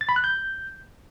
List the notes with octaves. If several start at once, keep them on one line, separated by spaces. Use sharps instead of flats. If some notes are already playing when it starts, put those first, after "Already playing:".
A6
B5
F#6
G6